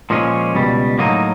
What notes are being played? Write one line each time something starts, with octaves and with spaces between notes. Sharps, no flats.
A#2 F3 G#3 C#4
C#2 B2 G3
A2 F#3 A#3 D#4